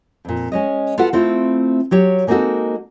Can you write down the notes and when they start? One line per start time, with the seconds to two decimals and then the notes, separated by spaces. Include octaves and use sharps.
0.25 F2 A#2
0.52 G#3 C#4 D#5
0.98 F4 F#4 A4 B4 F#5
1.13 A3 C4 E4 F4
1.91 F#3 G4 C#5
2.27 G#3 A#3 C4 D#4 F#4 A4